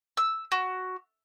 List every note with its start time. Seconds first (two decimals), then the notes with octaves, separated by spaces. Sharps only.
0.17 E6
0.52 F#4